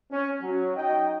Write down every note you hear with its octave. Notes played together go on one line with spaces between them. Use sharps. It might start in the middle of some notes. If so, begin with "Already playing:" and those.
C#4
F#3
D#4 F#4 D#5 G5